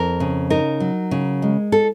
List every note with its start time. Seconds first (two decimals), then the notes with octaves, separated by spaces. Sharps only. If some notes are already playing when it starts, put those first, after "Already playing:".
Already playing: F2 A#4
0.20 C#3
0.50 D#4 A#4
0.80 F#3
1.11 C#3
1.42 G#3
1.72 A4